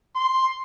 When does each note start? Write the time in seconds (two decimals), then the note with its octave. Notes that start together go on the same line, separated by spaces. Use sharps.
0.15 C6